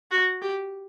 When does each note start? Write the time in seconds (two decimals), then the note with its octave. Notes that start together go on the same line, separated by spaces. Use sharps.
0.11 F#4
0.42 G4